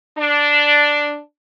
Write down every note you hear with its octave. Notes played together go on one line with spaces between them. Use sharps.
D4